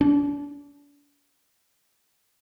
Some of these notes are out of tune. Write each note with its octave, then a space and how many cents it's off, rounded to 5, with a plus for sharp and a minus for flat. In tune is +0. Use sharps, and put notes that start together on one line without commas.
D4 -40